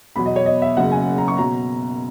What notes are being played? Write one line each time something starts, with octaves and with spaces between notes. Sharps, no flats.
E2 B2 F#3 B5
D#5
C#5
D#5
E5
F#1 F#2 C#3 F#3 F#5
G#5
A#5
C#6
B2 F#3 A#5